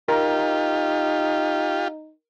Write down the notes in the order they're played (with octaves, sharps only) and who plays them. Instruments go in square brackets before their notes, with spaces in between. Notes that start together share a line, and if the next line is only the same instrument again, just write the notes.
[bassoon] D#4 [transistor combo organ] F4 G4 [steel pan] A#4